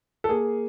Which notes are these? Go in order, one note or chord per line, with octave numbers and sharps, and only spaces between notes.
A4
A#3 G#4